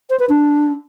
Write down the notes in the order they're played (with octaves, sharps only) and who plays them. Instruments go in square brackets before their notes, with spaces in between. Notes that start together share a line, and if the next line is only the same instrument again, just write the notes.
[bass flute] C5
B4
D4